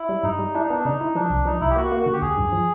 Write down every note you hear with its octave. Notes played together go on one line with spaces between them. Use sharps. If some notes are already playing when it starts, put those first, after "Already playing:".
Already playing: E4
G3
G2 D#4
G3
D4 E4
D#4
B3 D4
C#3 D#4
E4
F3 D4
C2
F3 D#4
C2 E4
G4
A#3 F#4
A#3
D3 F#4
G4
D2 G#4
G2
F3